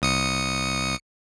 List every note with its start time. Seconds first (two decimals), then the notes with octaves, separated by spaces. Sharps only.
0.02 C2 D#6 C#7